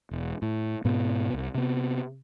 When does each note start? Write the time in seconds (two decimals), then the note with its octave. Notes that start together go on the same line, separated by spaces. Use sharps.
0.11 E1
0.42 A2
0.85 G#2 B2 B3
1.33 C2
1.55 C3 B3